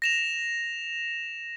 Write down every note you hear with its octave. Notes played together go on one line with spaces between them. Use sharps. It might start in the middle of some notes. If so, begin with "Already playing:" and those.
A#6 E7 F7